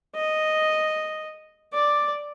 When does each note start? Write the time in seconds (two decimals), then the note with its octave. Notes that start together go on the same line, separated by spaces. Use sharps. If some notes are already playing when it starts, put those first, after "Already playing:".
0.16 D#5
1.74 D5